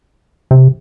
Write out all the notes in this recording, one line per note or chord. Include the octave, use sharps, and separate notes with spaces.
C3